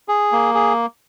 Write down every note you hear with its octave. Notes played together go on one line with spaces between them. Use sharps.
G#4
A#3
G#4